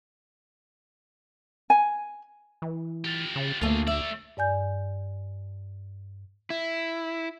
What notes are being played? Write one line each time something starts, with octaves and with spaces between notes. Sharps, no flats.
G#5
E3
F4 G4
C#3
D2 A3 A#3 F4 G#4
A3 D5 E5
G2 D5 G#5 G6
E4